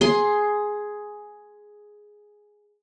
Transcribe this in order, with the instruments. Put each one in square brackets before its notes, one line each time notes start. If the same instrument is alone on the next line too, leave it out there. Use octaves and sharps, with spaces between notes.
[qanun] G#4 C6